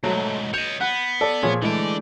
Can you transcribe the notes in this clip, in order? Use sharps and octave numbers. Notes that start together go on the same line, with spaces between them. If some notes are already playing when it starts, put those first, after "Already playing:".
G#2 B2 F#3 A3
C#5 D#5 G6 E7 F7
B3 F#5
A4 D5
A#2 F3 G#4 C#5
D3 E3 G#3 A3 D5